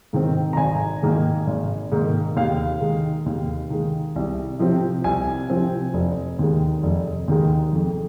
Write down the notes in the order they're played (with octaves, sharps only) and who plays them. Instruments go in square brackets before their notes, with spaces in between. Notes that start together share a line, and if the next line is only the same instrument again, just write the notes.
[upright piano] G#2 D#3 C4
A#5
G#1 G#5
G#2 D#3 A#3
G#1
G#2 D#3 A#3
D#2 F5
D#3 G#3
D#2
D#3 G#3
C2
C3 F3 C4
C2 G#5
C3 F3 C4
F1
D#2 D#3 G#3
F1
D#2 D#3 G#3
F2